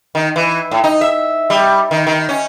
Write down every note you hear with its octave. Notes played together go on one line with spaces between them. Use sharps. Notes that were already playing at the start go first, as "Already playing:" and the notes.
D#3
E3
A2
D#4
E5
G3
D#3
D#3
C#4